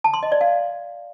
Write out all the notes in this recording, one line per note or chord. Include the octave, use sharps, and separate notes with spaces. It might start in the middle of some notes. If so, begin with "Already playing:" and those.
A5
C6
D#5
D5
F5